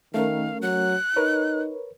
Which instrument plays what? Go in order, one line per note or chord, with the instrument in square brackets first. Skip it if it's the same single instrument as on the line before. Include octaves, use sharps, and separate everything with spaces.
[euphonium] D#3 [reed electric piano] A3 C#4 A#4 [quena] F5
[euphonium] F#3 [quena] F#6
[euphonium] D#4 [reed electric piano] A#4 B4 C#5